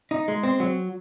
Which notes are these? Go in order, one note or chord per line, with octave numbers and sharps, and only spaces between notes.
D#4
G#3
C4
F#3